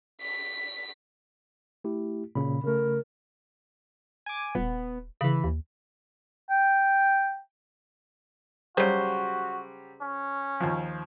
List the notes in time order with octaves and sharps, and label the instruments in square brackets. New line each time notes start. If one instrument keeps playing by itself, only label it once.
[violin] B6
[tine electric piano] A3 E4 G4
[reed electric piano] A#2 C#3 [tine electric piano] B5
[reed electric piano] C#3 A3 [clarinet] A#4
[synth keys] G#5 D6
[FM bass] D#1 [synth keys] B3
[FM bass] C#3 [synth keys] E3 B5
[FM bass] D#2
[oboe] G5
[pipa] C#3 C5 [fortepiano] F#3 G3 [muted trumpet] F#4
[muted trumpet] C#4
[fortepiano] D#2 F3